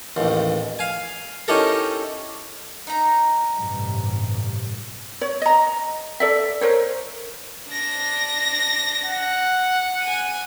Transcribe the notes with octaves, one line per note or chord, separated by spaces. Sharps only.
A1 D#2
F5 G#5
C#4 D#4 E4 G4 A4 A#4
D#4 A#5
A1 G2 C3
C#5
D#5 A#5
A4 D5 E5
A#4 C5 C#5
D4 A#6
F#5
G#5 D#7